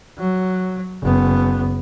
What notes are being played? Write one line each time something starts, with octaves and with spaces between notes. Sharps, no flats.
F#3
F#1 B3